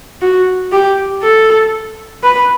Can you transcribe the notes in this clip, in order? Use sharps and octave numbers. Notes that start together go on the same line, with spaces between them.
F#4
G4
A4
B4